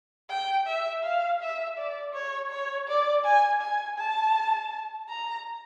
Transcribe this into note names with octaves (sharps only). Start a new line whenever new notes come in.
G5
E5
F5
E5
D5
C#5
C#5
D5
G#5
G#5
A5
A#5